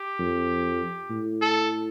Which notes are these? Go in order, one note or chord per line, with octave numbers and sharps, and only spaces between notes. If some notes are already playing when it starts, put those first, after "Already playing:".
Already playing: G4
F2
A2
A4